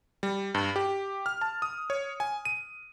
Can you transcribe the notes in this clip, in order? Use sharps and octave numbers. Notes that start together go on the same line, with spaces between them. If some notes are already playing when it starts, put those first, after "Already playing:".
G3
G2
G4
F6
A5
D#6
C#5
G#5
D#7